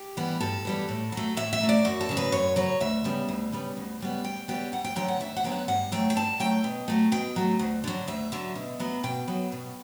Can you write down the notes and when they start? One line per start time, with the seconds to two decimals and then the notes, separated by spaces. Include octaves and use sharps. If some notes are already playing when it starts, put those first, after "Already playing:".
Already playing: G4
0.17 E3 G3 B3
0.40 G2 A4
0.65 E3 G3 B3
0.89 A2
1.12 F#3 A3
1.37 A2 E5
1.53 E5
1.61 F#3 A3
1.69 D5
1.85 F#2 F#4
2.01 A4
2.09 C#3 F#3
2.17 B4
2.32 F#2 C#5
2.56 C#3 F#3 C#5
2.80 D2 E5
3.04 C#3 G3 B3
3.28 D2
3.52 C#3 G3 B3
3.77 D2
4.00 C#3 G3 B3
4.24 D2 G5
4.48 C#3 G3 B3 G5
4.72 D2 F#5
4.84 G5
4.96 D3 F#3 B3 G5
5.08 F#5
5.20 D2 E5
5.36 F#5
5.44 D3 F#3 B3 G5
5.52 F#5
5.68 G2 F#5
5.92 F#3 A3 G5
6.10 G5
6.16 G2 A5
6.40 F#3 A3 G5
6.64 B2
6.88 F#3 A3
7.12 B2 G5
7.36 F#3 A3
7.59 D2
7.84 D3 F#3
8.08 D2 E5
8.32 D3 F#3
8.55 B2
8.80 F#3 B3
9.03 B2 G5
9.27 F#3 B3
9.52 B2